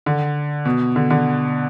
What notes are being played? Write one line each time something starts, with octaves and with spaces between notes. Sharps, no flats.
D3
B2
D3
D3